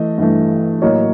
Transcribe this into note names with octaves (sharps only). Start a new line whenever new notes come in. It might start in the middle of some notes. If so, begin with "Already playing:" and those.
Already playing: E3 A3 D#5
G2 E3 A3
A2 F#3 A#3 C#5 D#5